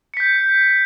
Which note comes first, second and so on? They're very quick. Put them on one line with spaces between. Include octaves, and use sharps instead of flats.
C#7 B6 G6